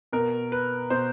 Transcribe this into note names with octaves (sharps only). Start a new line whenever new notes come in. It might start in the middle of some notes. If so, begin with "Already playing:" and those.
B2 A#4
B4
B2 C5